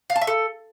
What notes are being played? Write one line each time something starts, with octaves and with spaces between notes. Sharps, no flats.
F5
A5
E5
A4